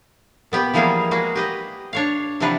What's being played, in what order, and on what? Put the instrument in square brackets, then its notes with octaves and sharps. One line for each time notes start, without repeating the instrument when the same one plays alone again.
[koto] A#2 B3 G4 B4
E3 F3 G3 A#3 F4 G#4
G#3 A#3 F#4 G#4
G4 B4 D#5
D4 C#5 F5
C3 E3 F3 D4 B4 F#5